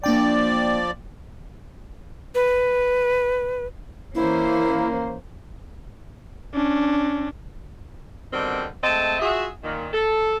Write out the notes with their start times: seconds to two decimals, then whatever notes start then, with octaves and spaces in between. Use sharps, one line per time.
0.04 F3 A#3 D4 D5 G5
2.35 B4
4.15 E3 A#3 C#4 E4 C5
6.54 C#4 D4
8.33 B2 D3 D#3 G3 C4
8.84 G#3 A3 C4 D#5 A5
9.20 F4 F#4 G#4 E5
9.64 A#2 D#3
9.93 A4